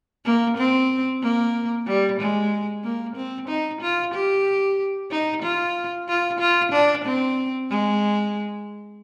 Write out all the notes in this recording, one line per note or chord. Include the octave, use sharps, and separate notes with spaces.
A#3
C4
A#3
G3
G#3
A#3
C4
D#4
F4
G4
D#4
F4
F4
F4
D4
C4
G#3